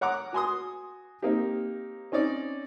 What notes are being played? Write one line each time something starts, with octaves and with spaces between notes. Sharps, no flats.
C#5 F#5 A#5 D6
F#4 G#5 C6 D#6
A#3 C4 D#4 G4
C4 C#4 D#4 C#5 D5